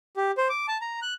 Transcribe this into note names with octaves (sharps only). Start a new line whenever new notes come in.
G4
C5
D6
A5
A#5
F#6